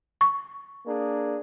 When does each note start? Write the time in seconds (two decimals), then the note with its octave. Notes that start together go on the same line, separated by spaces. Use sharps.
0.21 C#6
0.86 A#3 D4 G#4